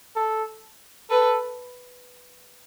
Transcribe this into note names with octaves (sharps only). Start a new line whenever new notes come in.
A4
A4 B4